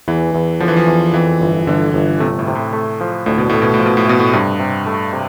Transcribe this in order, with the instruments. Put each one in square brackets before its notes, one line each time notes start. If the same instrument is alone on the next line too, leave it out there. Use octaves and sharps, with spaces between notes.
[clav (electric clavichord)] E2 [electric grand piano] E3
[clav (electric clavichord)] E2
[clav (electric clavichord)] D3 [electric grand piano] F3
[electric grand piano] E3
F3
[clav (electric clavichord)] E2
[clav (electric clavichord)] F2 [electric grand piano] E3
[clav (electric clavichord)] G1
[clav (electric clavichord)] G1 [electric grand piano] D3
[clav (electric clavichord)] G1
[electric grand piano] C3 [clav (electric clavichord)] A3
[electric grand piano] A2
[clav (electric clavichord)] C3
[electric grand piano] A2
[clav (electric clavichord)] A3
F3
[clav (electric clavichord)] D2 [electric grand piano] A2
[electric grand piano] B2
[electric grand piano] A2 [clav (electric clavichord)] A3
[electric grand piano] B2
A2
[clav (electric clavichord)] F3
[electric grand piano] B2
A2
[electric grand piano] B2 [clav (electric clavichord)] A3
[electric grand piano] A2
[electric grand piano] G2 [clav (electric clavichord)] C3
[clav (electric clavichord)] C3
A3
C3